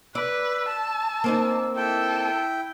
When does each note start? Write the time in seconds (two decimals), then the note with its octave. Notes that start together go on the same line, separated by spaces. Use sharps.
0.15 B4 D5 E6
0.69 A5
1.24 A#3 C4 D#4
1.77 E4 A4 G5